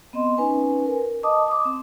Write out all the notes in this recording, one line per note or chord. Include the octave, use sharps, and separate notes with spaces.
B3 C4 D#5 C6
C#4 D#4 B4 G#5
A#4
D#5 A5 D6 D#6
D6 D#6
C4